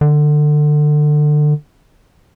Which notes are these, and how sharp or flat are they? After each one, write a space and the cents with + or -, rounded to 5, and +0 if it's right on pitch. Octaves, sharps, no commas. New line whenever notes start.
D3 +25